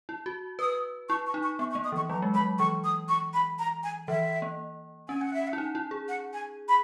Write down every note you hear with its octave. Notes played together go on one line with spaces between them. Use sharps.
E4
F#4
B4 D#6
E4 C#6
C#6
D#4
C#6
B3 C#6
C#6
A#3
D#6
E3 C#6
F#3 A#5
G#3
F#3 B5
E3 C#6
D#6
C#6
B5
A#5
G#5
E3 E5
A#3
C#4 G#5
F#5
E5
F#5
E4
D#4
E4
G#4
F#5
G#5
B5